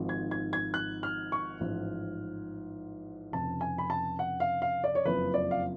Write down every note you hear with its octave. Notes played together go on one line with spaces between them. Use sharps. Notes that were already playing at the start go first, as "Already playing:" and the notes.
Already playing: G#1 G#2 F3
G#6
G#6
G#6
F#6
F6
C#6
A1 G#2 F3
F1 F2 C#3 A5
G#5
B5
A5
F#5
F5
F5
D5
C#5
F#1 F2 F3 B4
D5
F5